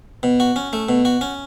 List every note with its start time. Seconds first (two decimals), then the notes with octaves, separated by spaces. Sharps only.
0.23 B2
0.40 F#4
0.56 C#4
0.73 A3
0.89 B2
1.05 F#4
1.21 C#4